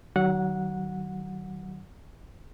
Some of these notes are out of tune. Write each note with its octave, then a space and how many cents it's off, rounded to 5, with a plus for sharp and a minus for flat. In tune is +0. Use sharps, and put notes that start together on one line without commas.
D#3 -15 F#3 +30 F#5 -15